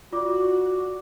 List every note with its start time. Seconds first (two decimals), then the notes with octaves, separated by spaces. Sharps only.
0.12 F4 F#4 D5 D6